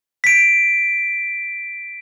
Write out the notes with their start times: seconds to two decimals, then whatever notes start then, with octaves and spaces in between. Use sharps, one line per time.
0.24 B6 D7